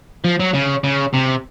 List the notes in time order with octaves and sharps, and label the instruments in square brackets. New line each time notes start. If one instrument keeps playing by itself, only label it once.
[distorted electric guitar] F3
F#3
C#3
C#3
C3